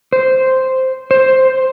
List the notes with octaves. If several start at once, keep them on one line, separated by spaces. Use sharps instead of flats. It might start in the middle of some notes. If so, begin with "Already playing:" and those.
C5
C5